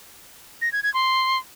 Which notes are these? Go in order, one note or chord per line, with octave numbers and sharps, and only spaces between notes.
A#6
G#6
G#6
C6